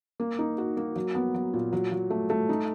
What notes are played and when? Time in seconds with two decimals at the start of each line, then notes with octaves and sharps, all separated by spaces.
0.20 A#3
0.39 D#4
0.58 F#4
0.77 A#3
0.96 F#3
1.15 B3
1.34 F#3
1.54 A#2
1.73 F#3
1.92 F#3
2.10 A3
2.30 A3
2.49 D#4